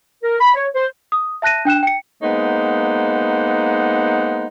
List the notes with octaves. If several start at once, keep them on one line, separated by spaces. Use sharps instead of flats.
A#4
B5
C#5
C5
D#6
E5 A5 F#6 A#6 D#7
D4 G5 F#6 E7
G5 C#7
G#3 A#3 B3 D#4 C5 F#5